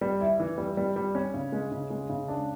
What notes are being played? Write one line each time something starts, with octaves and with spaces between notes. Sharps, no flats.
G3
E4
E3
G3
G3
G3
C#4
C#3
G#3
C#3
G#3
C#3
D4